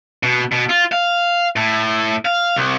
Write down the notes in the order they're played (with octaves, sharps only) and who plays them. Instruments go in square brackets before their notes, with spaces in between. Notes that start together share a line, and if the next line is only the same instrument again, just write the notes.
[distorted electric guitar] B2
B2
F4
F5
A2
F5
C2